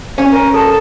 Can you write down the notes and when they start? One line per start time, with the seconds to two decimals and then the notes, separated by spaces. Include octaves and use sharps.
0.18 C#4 G#5
0.31 A#4
0.54 A4 A5